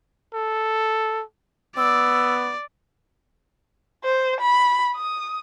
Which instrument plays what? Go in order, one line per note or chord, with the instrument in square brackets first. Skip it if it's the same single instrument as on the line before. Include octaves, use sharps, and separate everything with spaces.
[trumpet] A4
[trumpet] B3 [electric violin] D5 [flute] E6
[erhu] C5
B5
D#6